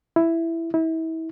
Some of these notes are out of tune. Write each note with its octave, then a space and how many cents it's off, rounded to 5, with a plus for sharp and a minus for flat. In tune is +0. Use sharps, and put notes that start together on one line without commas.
E4 +5
E4 -35